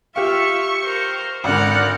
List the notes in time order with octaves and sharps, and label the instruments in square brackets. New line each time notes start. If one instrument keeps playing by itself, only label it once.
[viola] F4 E5 [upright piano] G4 F5 [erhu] C#6
[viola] A#4 C5
[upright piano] G#1 D3 [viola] A#4 D5 [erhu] F#5